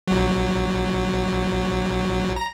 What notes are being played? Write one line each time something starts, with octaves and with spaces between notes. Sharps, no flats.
A#1 F#3
A#5